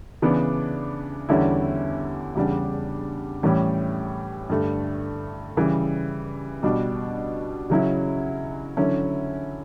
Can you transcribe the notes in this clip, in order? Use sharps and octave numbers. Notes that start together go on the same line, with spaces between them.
C#3 E3 B3 D4
E2 D3 G3 C#4 E4
E2 C#3 G3 D4
A2 E3 G3 C#4
G2 D3 A3
C#3 E3 G3
B2 G3 D4
C#3 F#3 C#4 E4
D3 F#3 C#4 E4